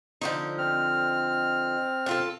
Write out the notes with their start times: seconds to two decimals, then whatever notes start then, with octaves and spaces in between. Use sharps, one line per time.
0.21 D3 F3 D#4
0.58 C4 F6
2.06 D4 F4 A4